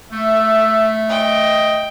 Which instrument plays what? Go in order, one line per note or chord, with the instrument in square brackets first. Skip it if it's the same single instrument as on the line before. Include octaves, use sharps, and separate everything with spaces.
[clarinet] A3 [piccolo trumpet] E5
[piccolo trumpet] D#5 [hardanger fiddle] G5